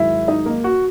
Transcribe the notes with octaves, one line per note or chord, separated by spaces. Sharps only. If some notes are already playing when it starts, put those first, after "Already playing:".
Already playing: G#2 D#3 F#3 E4 E5
D#4 D#5
A#3 A#4
F#4